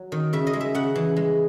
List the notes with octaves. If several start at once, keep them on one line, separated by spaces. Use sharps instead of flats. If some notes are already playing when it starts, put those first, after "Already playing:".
Already playing: F#3
D#3
C#3 E5
D#5
G#3
E5
C#3 F#5
E3
G#3